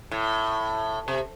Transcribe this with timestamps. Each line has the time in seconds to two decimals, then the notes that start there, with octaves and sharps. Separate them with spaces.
0.11 A2
1.08 C3